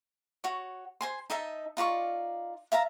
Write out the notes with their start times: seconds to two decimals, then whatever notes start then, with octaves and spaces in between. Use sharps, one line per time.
0.44 F#4 C#5
1.01 C5 G#5 C6
1.30 D#4 D#5 E5 A5
1.77 D#4 F4 D5 C#6
2.72 E5 F5 A5 A#5